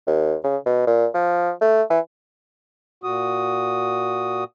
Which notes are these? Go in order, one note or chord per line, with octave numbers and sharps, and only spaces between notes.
D#2
C#3
B2
A#2
F3
A3
E3
A#2 F#4 D#6